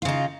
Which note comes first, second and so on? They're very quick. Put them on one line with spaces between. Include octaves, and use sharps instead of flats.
F4 C#3 D#4